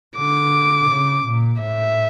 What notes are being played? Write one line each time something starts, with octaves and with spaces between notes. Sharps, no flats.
D3 D6
C#3
A#2
A2 E5